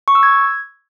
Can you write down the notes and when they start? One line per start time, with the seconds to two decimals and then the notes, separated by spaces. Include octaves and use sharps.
0.08 C#6
0.15 E6
0.23 G#6